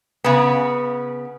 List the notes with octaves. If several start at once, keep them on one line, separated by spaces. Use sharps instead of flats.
C#3 B3